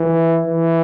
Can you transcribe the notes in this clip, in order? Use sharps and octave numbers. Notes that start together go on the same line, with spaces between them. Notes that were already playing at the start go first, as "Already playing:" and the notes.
Already playing: E3
E3